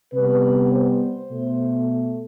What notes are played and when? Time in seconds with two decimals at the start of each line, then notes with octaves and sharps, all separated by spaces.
0.13 C3 G3 B3 B4
0.70 C5
1.28 B2 A3